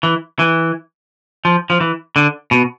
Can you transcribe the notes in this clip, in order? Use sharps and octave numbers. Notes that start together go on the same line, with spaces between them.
E3
E3
F3
F3
E3
D3
B2